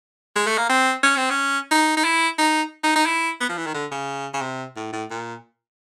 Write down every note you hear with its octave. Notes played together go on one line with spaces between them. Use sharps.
G#3
A3
A#3
C4
C#4
C4
C#4
D#4
D#4
E4
D#4
D#4
D#4
E4
B3
F3
E3
D#3
D3
C#3
C#3
C3
A2
A2
A#2